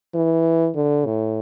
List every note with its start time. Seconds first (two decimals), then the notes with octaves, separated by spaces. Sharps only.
0.15 E3
0.75 D3
1.06 A2